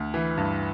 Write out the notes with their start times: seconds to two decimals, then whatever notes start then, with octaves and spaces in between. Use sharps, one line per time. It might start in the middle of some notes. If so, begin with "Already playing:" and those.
Already playing: D2
0.14 E3
0.37 G2